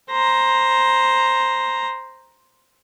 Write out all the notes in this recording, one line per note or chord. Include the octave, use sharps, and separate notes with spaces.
C5 A#5